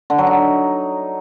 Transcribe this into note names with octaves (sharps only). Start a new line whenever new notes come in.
D3
F#3
D#4